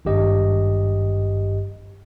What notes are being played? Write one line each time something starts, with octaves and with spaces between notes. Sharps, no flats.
G#1 G2 G4 D#5